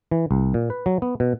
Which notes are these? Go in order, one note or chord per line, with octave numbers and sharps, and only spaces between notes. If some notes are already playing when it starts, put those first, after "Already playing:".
E3
C2
A#2
B4
F#3
B3
B2